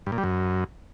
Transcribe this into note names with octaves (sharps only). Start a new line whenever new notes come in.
G2
A#2
G3
F#2